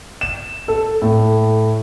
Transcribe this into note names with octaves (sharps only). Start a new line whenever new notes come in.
E7
A4
A2